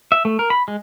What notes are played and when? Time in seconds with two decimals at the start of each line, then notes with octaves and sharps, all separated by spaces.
0.12 E5
0.25 A3
0.39 A#4
0.50 B5
0.68 G#3